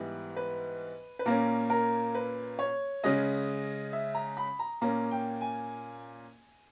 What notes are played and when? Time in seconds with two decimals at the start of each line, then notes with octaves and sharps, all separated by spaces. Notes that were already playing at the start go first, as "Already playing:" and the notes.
Already playing: G#2 E3 G3 B3
0.37 B4
1.19 B4
1.26 A#2 A#3 C#4 A#4
1.70 A#4
2.15 B4
2.59 C#5
3.04 C#3 G#3 C#4 D#5
3.93 E5
4.15 A#5
4.37 B5
4.59 A#5
4.81 A#2 A#3 C#4 A#5
5.11 G5
5.41 G#5